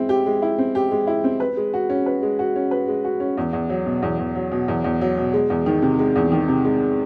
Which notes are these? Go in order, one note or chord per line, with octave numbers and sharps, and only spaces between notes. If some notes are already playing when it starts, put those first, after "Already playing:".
Already playing: G#3 C4 E4
G4
G#3
E4
C4
G4
G#3
E4
C4
B4
G#3
F#4
C#4
B4
G#3
F#4
C#4
B4
G#3
F#4
C#4
E2
E2
F#3
B2
E2
E2
F#3
B2
E2
E2
F#3
B2
G#3
E2
D#3
C3
G#3
E2
D#3
C3
G#3